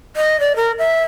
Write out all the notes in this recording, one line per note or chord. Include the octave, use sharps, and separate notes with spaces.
D#5
D5
A#4
E5